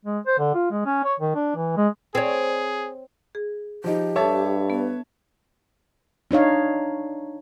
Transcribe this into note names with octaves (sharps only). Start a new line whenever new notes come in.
G#3
C5
D3
F4
G#3
C#4
C#5
D#3
D4
E3
G#3
C4 G#4 C#5
G#4
F3 D#4 G4
G2 D4 A4 C#5 E5 A5
B3 B4
D4 D#4 C#5 F5